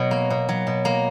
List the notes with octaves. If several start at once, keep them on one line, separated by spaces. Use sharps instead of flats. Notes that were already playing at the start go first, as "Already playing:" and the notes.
Already playing: B2 F#3
A#3
B2
F#3
B2
A#3